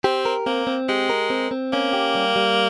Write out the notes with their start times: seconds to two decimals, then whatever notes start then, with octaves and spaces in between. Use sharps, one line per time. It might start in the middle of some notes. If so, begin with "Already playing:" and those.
0.04 C4 G4
0.25 A#4
0.46 A#3 C4
0.67 C4
0.89 G#3 G4
1.09 A#4
1.30 C4
1.51 C4
1.73 A#3 C#4
1.93 G4
2.15 G3
2.36 G3